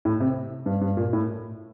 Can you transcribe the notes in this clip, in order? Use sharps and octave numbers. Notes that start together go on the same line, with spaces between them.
A2
C3
G2
G2
A#2
A2